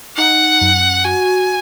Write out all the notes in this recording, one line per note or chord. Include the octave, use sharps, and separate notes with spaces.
D#4 F#5
F#2
F#4 G#5